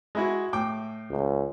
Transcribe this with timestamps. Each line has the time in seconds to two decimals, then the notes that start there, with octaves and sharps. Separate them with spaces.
0.15 G#3 E4 F#4
0.53 A2 G5 D6
1.10 C#2